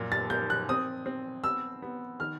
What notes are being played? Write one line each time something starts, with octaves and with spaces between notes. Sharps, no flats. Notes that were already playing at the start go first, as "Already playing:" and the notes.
Already playing: F#2 A#2
A6
A#3 G6
F#6
C4 D#6
C4
B3 E6
B3
D#3 F6